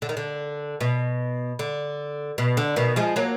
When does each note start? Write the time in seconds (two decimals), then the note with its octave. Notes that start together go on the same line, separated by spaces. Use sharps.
0.02 D3
0.09 D#3
0.17 D3
0.81 B2
1.59 D3
2.38 B2
2.57 D3
2.76 B2 D#3
2.96 F3 G#3
3.16 F#3 A#3